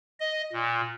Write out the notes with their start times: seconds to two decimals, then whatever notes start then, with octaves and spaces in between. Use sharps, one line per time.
0.20 D#5
0.53 A#2